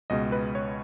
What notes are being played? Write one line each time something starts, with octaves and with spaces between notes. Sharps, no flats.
C#2 B2 G#3 D#5
B4
C#5